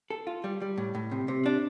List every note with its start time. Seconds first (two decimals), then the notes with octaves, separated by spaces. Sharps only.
0.10 A4
0.27 F4
0.44 G3
0.62 G3
0.78 A2
0.95 A2
1.11 C3
1.28 C3
1.46 D4